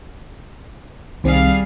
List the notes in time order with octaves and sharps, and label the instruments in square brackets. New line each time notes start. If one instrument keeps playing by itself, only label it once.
[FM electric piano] C2 D#3 C4 [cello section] G3 G#4 F5